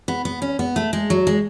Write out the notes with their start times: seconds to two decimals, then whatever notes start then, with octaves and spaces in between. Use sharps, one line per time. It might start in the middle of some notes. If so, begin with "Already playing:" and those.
0.08 B3
0.25 B3
0.42 C#4
0.59 B3
0.76 A3
0.93 G#3
1.10 F#3
1.27 G#3